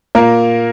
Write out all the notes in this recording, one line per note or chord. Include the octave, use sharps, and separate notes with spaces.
A#2 A#3 A#4